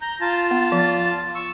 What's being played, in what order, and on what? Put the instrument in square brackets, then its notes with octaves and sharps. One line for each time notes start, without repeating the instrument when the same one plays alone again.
[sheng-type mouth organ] A#5 G6
F4 A5
[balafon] B3
F3
[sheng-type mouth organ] C#6 E6